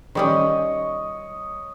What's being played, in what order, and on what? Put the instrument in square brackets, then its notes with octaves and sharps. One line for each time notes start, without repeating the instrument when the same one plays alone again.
[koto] D#3 G3 C#4 [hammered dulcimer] C#5 D#5